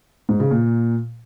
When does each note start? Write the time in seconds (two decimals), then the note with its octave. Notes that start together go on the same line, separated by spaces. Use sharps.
0.29 G#2
0.40 C#3
0.51 A#2